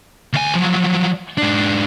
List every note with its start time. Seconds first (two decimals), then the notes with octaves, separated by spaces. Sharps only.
0.33 D2 G#5
0.55 F3 F#3
1.38 G#2 D4